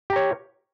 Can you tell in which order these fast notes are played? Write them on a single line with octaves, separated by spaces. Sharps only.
G4 A#5 C#5